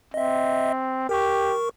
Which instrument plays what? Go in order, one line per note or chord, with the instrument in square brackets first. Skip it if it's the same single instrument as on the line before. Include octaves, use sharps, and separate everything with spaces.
[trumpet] C4 [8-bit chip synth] D#5 E5
[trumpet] G4 [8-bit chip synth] A#4 C#6